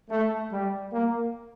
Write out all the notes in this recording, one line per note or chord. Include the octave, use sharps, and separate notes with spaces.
A3
G3
A#3